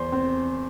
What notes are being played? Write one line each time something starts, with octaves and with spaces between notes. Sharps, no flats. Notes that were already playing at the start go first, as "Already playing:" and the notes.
Already playing: E2 C5
C4